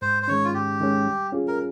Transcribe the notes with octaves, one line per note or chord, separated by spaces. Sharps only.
G#2 C5
C5
D#3 G#3 C#4 C#5
F4
G#2 G4
D#3 G#3 C#4
G3
C#4 F4 G#4
A#4